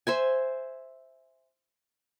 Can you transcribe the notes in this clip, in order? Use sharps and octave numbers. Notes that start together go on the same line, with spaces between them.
C5 E5 G#5